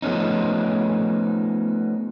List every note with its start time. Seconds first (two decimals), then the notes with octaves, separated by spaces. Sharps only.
0.02 F3 A3 B3 C#4 D#4